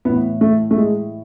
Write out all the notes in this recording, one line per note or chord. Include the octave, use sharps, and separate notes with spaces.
A2 E3 B3
A3
A3
G#3